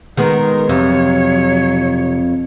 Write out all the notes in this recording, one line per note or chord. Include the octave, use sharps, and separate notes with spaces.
D#3 G#3 B3 D#4 A#4
F2 C3 F#3 C#5